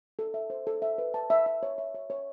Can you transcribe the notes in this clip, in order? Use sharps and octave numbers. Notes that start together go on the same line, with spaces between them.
A4
E5
C5
A4
E5
B4
A5
E5
E5
C#5
E5
C#5
C#5